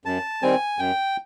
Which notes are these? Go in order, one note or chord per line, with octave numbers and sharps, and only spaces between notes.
F#2 A5
D#3 G3 C4 G#5
F#2 G5